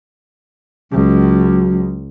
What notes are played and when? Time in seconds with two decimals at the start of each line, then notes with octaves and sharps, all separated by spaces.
0.92 C#2 F#3